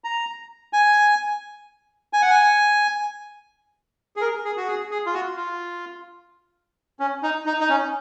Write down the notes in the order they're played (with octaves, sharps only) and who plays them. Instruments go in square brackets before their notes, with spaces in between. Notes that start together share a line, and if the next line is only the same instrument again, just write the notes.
[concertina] A#5
G#5
G#5
F#5
G#5
G#4
A#4
G#4
F#4
G#4
G#4
F4
F#4
F4
C#4
D#4
D#4
D#4
C#4